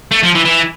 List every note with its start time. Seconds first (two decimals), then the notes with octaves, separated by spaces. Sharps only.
0.11 A3
0.23 F3
0.35 E3
0.45 E3